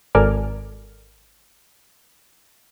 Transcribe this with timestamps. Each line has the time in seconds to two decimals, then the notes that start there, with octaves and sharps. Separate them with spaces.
0.15 G#1 A4 A#4 D5 G#5 F6